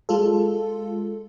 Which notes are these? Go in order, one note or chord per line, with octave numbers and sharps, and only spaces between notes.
G#3 F4 A4